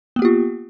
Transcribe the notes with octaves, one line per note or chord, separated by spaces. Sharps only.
A#3 B3 F4 G4